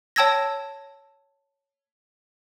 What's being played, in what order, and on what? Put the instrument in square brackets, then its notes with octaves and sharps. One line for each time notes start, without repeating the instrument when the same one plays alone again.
[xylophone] C#5 G5 A5 E6 G#6 A#6